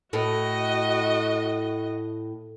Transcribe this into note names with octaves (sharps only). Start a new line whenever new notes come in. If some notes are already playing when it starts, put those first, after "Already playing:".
A2 F#4 D#5